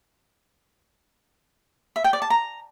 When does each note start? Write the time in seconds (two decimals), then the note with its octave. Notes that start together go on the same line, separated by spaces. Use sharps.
1.96 E5
2.04 G5
2.13 D5
2.22 A5
2.30 A#5